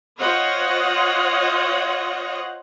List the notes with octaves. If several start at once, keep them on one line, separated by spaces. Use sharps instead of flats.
F4 C5 C#5 D#5 F#5